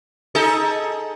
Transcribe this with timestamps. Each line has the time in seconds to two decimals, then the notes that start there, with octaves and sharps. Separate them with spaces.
0.35 D#4 G#4 A4